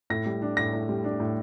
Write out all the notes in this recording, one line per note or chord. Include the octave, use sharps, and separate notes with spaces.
A2 A#6
G3
D4
A2 A#6
A2
G3
D4
A2